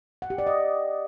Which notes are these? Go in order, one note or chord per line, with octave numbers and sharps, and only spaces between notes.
F#5
G4
D5
D#5